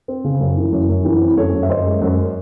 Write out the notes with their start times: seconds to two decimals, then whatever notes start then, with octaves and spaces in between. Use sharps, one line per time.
0.08 C4
0.24 C#3
0.40 F#2
0.57 E3
0.72 F#2
0.89 F#2
1.05 E3
1.21 C4
1.37 F#2 A4 C#5
1.53 F#2
1.63 E5
1.69 F#2 C5 D#5
1.86 G#3
2.02 F#2